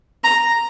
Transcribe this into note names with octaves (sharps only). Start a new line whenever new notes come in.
A#5